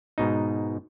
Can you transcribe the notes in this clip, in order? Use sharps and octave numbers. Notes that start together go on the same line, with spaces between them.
G#2 B2 D#4